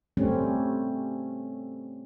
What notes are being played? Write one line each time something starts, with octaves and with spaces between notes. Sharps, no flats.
G3 A3 C4 C#4